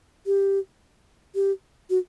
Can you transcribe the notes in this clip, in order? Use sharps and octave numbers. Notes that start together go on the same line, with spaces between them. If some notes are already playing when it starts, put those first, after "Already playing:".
G4
G4
F#4